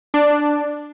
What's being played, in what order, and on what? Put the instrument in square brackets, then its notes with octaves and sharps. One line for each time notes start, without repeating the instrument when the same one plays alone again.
[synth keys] D4